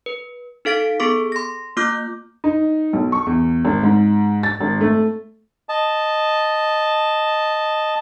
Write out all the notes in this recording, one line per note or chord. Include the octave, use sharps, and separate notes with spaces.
B4
D#4 A4 F5 A6 B6 D7
B3 G#4 A4 C#6 D6
C6 A#6
A#3 F4 D6 F6 G6
D#4
B1
C#6
E2
G#1
G#2
A6
G#1
A3
D#5 A5